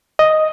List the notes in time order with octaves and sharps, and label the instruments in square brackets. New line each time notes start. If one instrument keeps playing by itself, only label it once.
[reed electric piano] D#5